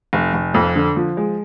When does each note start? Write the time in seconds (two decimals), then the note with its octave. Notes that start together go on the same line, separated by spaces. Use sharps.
0.13 F1
0.34 F1
0.54 F2
0.75 D3
0.96 F3
1.17 G#3